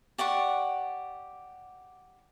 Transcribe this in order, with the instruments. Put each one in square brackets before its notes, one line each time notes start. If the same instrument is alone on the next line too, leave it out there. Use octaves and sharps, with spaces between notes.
[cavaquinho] G4 D5 F#5 C#6